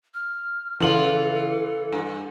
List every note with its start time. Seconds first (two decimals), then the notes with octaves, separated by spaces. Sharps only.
0.14 F6
0.80 C#3 E3 F4 A4 F#7
1.92 G2